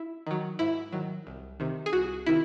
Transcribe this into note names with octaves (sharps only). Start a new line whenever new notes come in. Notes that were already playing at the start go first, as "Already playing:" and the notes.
Already playing: E4
D#3 F#3
G#2 E4
D#3 F#3
C2
C3 D#3
G#4
C2 F#4
C3 D#3 E4